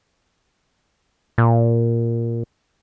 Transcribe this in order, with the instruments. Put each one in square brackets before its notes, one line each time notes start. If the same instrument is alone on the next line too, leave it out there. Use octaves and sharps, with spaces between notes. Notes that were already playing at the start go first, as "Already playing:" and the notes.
[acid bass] A#2